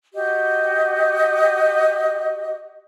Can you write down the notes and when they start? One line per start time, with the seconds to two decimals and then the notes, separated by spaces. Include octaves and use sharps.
0.15 F#4 G4 D#5